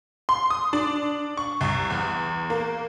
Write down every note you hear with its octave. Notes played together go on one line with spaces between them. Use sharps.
C6
D#6
D4
C#6
C2
E2
A#3